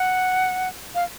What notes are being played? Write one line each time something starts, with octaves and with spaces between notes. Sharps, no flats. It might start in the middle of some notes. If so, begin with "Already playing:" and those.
Already playing: F#5
F5